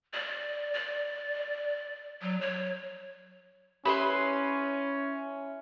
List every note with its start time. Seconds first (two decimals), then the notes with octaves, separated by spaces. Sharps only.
0.14 D5
0.74 D5
2.22 F#3
2.41 C#5
3.85 C#4 E4 G4 B4 B5 C6